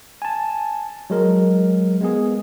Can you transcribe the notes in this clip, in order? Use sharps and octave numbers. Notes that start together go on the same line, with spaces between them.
G#5 A5
F#3 G#3 A#4
G#3 B3 G#4